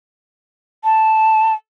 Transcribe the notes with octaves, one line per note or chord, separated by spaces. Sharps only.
A5